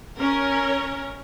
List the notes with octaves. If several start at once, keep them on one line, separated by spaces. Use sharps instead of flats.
C#4 A#4 C#5